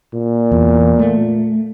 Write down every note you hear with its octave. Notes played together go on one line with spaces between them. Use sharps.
A#2
E2
A3